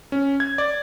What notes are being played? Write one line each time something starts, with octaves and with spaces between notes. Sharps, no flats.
C#4
G#6
D5